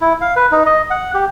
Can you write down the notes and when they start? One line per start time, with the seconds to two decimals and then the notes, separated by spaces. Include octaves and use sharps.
0.01 E4
0.21 F5
0.36 B4
0.52 D#4
0.66 D#5
0.90 F#5
1.14 G4